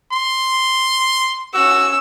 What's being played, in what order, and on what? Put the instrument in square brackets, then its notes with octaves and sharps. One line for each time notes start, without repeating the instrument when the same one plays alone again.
[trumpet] C6
[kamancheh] C#4 E6 [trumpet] F#4